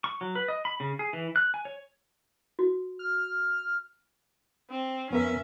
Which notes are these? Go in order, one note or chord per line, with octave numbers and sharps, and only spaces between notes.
C#6
F#3
B4
D#5
B5
C#3
G#4
E3
F#6
G#5
C#5
F#4
F6
C4
F2 B3 C#4 A#4 E5